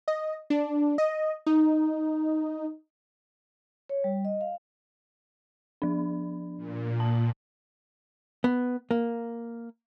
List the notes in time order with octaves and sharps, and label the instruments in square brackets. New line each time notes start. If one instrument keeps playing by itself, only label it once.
[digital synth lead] D#5
D4
D#5
D#4
[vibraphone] C#5
G3
D#5
F5
[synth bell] F3 D4
[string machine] A#2
[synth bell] A5
[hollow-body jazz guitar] B3
A#3